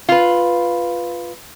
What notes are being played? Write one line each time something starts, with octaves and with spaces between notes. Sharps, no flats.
F4 B4